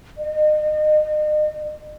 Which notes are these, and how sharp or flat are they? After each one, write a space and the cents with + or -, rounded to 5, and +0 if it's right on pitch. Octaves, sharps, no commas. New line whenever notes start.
D#5 -40